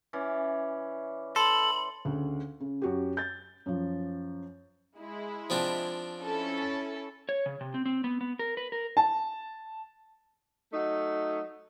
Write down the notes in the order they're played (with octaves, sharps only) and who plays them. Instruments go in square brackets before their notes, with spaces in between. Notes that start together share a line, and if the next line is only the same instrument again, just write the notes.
[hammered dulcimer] E3 C#4 D5
[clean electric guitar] A4 [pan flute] B5 [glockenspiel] C6
[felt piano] D2 C#3
C#3
F#2 F#4 G4
G6 A6
F#2 F3
[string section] G#3 E4
[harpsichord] F3 C4 D4
[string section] C#4 E4 A4
[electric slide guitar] C#5
C#3
C3
C4
C4
B3
B3
A#4
B4
A#4
[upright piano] A5
[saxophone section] F#3 A3 D#4